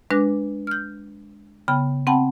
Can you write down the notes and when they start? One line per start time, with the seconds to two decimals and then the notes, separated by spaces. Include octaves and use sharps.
0.10 G#3 D4 B4 D6 F#6 A#6
0.67 F6 G6
1.68 C#3 B3 G5 B5
2.07 C4 F#5 G5 A5 B5